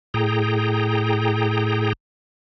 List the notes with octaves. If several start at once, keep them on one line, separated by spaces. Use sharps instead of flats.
A2 G#4 G5 A#5